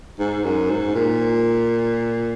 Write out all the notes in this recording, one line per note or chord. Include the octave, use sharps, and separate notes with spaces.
G#2
F#2
G#2
A#2